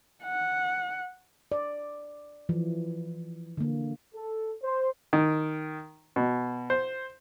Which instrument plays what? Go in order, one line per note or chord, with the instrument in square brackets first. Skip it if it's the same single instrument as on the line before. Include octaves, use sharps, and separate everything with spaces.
[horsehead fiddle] F#5
[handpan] D5
E3 F3
D3 A#3
[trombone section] A4
C5
[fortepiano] D#3
B2
C5